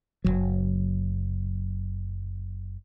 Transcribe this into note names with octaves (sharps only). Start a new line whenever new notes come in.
F#1 B1 F#3